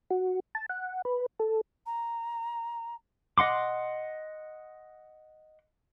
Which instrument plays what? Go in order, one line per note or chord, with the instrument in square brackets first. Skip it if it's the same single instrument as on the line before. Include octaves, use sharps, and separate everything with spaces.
[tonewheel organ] F#4
A5
F#5
B4
A4
[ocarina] A#5
[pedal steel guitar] D#5 F#5 C6 D6